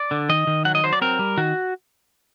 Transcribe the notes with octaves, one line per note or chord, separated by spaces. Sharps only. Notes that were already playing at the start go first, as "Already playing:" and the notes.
Already playing: D5
D3
D#3 D#5
D#3
F#3 F#5
D#5
F#3 C5
D5
C4 A#4
G3
D#3 F#4